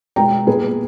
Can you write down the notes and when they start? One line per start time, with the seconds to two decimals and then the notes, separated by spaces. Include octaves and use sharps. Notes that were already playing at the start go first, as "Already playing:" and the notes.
0.16 B2 G#3 B3 G5 A#5
0.47 A#2 G3 B3 E4 G#4 B4